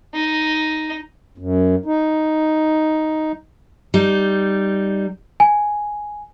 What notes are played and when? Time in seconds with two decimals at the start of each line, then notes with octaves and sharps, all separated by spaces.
0.14 D#4
1.38 F#2
1.86 D#4
3.94 G3 D#4
5.40 G#5